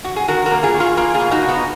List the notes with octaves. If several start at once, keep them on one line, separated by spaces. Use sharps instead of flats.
F#4
G#4
D#3 F#4 A#4
F#4 A#4
A#3
F4 G#4
D#3
F4 G#4
A#3 F4 G#4
F4 G#4
B2
D#4 F#4
B2
B3 D#4